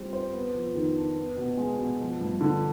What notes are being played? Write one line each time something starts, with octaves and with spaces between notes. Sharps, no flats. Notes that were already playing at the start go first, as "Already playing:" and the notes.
Already playing: G3 C4 F4
C5
B3
F2
D#3
D4
B3
B2
G#3
B2
F3
G2
D3